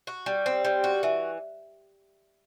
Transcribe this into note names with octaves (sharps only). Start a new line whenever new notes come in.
F#4
G3
C4
G3
F#4
E3